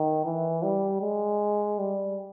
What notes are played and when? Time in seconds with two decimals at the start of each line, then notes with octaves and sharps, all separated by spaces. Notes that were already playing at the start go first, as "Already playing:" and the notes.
Already playing: D#3
0.25 E3
0.63 G3
1.01 G#3
1.79 G3